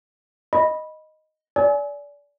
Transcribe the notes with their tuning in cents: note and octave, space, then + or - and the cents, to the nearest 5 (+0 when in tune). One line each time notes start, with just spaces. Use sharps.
D#5 +0 B5 -10
D5 -25 G#5 +20 E6 -35